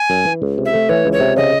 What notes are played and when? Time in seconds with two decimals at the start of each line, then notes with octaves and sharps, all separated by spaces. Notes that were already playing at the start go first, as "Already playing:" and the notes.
Already playing: G#5
0.10 F#2
0.26 E3
0.42 C#2
0.58 C3
0.65 E5
0.73 A3
0.89 E3 C#5
1.05 C#2
1.12 C#5
1.20 C3
1.36 C#3 D#5